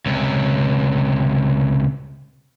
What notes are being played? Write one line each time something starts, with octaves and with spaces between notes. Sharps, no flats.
C#2 C3